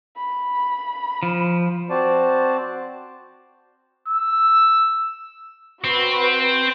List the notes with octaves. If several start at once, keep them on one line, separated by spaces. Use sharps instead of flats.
B5
F3
C4 F#4 C5 D5 A5
E6
C4 F#4 B4